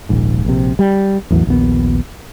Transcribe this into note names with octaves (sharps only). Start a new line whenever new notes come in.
D#1 A#1 G#2
A#1 C3
G3
A1 E2 E3 F#3
A#1 D#2 B3